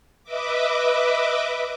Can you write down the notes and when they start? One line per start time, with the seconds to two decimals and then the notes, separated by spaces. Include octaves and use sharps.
0.23 B4 D#5 E5 D6